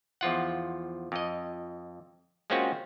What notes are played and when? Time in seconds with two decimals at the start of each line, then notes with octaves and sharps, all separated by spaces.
0.21 E2 F3 F4 F#5
1.12 F2 D#5
2.50 G#3 A#3 C4 C#4 F4 F#4